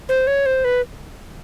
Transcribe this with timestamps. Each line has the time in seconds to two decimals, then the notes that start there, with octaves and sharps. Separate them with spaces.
0.09 C5
0.27 C#5
0.46 C5
0.65 B4